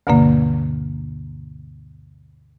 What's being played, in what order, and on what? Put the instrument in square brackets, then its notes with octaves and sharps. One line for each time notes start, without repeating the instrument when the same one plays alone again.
[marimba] D2 G2 B2 D3 A#3